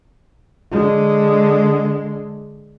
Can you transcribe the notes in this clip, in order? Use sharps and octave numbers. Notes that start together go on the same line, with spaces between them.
D3 G#3